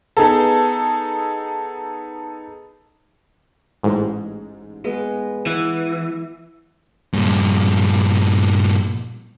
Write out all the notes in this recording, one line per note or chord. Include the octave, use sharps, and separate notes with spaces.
B3 D#4 G#4 A4
A1 G#2
G#3 B3
E3 F#5
G2 A#2